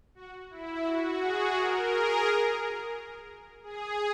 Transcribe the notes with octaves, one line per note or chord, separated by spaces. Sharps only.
F#4
E4
F#4
G#4
A#4
G#4
G#4